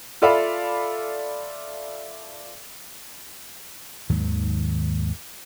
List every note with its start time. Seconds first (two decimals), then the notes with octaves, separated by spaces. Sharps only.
0.22 F4 A4 D5 E5 F5 B5
4.10 D#2 G#2 D#3 F#3